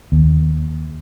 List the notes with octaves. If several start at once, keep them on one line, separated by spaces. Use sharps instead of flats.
D#2